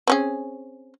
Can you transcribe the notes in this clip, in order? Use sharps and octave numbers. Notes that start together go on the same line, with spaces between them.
C4 C#4 G#4